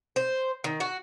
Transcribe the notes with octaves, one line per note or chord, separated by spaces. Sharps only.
C5
D#3
F#4